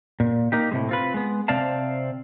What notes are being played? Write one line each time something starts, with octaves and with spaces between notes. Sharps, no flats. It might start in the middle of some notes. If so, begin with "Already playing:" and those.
A#2
A#3 D#4 G4
A2 C3 G#3
C4 F4 B4
G#3 B3
C3 C4 D5 F5 A5